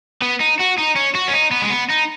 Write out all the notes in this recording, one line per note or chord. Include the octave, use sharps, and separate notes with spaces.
B3
D#4
F#4
D#4
C#4
F#4
C#4
D#4
B3
G#3
B3
D#4